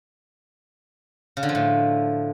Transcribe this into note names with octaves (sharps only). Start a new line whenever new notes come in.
C#3
D3
F3
A2